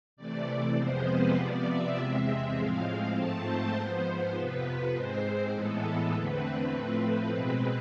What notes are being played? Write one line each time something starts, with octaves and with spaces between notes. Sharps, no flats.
C3 E3 A3 D5
F2 C3 F3 G#3 B3 C5
B4
C3 F3 B3 D5
E5
E2 C3 G#3 C4 E5
A2 F3 G#3 C4 F5
G#2 F3 A3 C4 A5
C5
G#2 F3 B3
F2 C3 F3 B3 B4
B4
G#2 G#3 C4 C5
C5
A2 E3 G#3 B3 A4
A4
E2 D3 A3 C4 B4
A2 F3 A3 C4
B2 G#3 C4